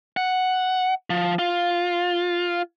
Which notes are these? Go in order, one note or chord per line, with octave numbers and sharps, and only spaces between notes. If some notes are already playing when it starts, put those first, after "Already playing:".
F#5
F3
F4